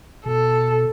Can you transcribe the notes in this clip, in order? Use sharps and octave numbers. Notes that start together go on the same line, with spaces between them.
B2 A4